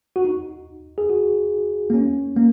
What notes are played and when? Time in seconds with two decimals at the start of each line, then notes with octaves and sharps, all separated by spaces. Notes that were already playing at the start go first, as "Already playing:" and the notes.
0.16 F#4
0.25 D#4
0.98 G#4
1.10 F#4
1.90 A#3
1.94 C#4
2.36 A#3